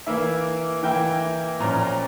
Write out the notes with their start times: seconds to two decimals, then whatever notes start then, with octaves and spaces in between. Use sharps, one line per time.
0.06 E3 A#3 E4 E5
0.83 E3 A#3 E4 G5
1.60 A#2 F3 C#4 A#5
1.79 A#5